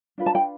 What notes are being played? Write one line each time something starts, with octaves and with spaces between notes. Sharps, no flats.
D4 F4 B4
A5
G5